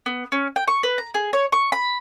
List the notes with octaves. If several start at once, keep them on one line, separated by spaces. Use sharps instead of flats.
B3
C#4
G5
C#6
B4
A#5
G#4
C#5
C#6
B5